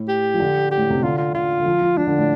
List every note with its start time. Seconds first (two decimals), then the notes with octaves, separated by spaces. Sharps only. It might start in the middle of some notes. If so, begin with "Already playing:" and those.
Already playing: A2
0.08 G4
0.34 F3
0.40 D3
0.71 G4
0.77 A2
0.90 C3
1.03 D3 F4
1.18 F4
1.34 D3 F4
1.60 D3
1.66 F3
1.82 F3
1.97 F3 D4
2.07 D3
2.18 A2